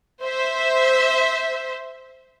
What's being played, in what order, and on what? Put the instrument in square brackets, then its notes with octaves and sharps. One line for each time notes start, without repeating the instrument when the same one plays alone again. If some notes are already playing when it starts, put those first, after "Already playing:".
[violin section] C5 E5